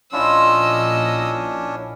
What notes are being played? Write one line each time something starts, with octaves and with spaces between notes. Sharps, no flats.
A#1 C#4 D4 E4 F4 D#5 E6